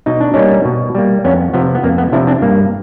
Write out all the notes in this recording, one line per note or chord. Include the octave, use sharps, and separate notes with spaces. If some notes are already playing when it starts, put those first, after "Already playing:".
B2 D#4
D4
G3 A#3 C#4 D#4
B2
G3 A#3
F2 B3 C#4
C3 F3 B3
B3
F2 A#3
B3
C3 F3 D4 E4
C4 D4
G2 A#3